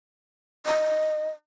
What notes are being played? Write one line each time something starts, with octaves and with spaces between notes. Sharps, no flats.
D#5